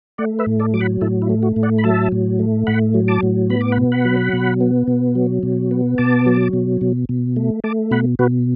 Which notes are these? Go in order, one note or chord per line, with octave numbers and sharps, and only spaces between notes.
A3 D5 F#5
B4 E5
A2
A4 D5
F#3 D6
F#5 B5
A2 E4 A4
E4
A3
F#4
A2
D5 F#5
B5
F#3 E5 A5
A2
A3
A2 F#5 B5
F#3
A5 D6
A2
B3 B5
D6
F#5 B5
B2
F#5 B5
F#3
B2
B3
B2
F#3
B2
B3
B2 A5 D6
F#3
B2
B2
B2
A3
A3 A5 D6
B2 F#5 B5
B2 F#4 B4